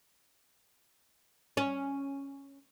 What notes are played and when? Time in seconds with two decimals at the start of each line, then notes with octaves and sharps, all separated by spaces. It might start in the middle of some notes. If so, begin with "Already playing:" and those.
1.57 C#4